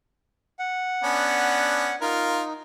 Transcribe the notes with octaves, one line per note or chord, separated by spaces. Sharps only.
F#5
B3 C#4 D4
D#4 F4 A#4